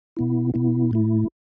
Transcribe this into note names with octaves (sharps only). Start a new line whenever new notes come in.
B2 B3 E4
B2 B3 E4
A2 A3 E4